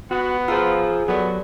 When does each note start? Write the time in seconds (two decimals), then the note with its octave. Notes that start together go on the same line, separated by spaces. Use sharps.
0.11 B3 F#4
0.48 F4 G#4 C5 A#5 E6 F6
1.08 F#3 B3 G4 A4 D5